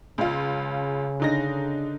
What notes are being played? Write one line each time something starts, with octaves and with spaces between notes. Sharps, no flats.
C#2 C#3 F4
D3 D#4 A#6